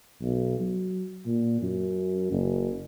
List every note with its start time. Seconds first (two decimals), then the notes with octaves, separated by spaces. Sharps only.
0.22 B1
0.60 F#3
1.26 A#2
1.62 F#2
2.32 F#1